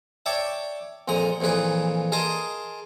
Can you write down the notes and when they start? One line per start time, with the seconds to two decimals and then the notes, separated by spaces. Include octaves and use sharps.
0.26 C#5 D5 E5 G5 A5
1.08 F2 A#2 G#3 A#5 D#6
1.41 F2 A#2 E3 G#4 B4
2.12 G#4 A#4 D#5 A5 C6 D#6